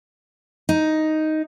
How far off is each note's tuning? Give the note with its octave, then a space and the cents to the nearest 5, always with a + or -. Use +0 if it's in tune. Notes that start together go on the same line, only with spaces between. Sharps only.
D#4 +5